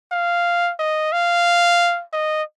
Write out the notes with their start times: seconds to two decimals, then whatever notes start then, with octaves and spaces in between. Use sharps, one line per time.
0.12 F5
0.79 D#5
1.12 F5
2.13 D#5